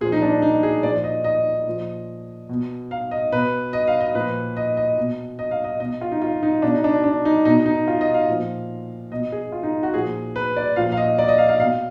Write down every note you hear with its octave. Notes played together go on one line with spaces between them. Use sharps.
A#2 F3 G#4
D#4
D4
D#4
G#4
A#2 F3 D5
D#5
D#5
A#2 F3
B2
F5
D#5
B2 B4
D#5
F5
D#5
A#2 F3 B4
D#5
D#5
B2
D#5
F5
D#5
B2 D#5
F4
D#4
F4
D#4
B2 D4
D#4
D4
D4
D#4
B2 D#4
D#4
F4
D#5
F5
A#2 F3
B2 D#5
G#4
F4
D#4
F#4
A#2 F3 G#4
B4
D5
A#2 F3 F5
F5
D#5
D5
D#5
F5
F5
B2 F5